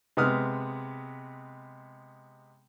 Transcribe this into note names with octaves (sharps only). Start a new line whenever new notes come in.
C3 G#3 B3 D#6 F6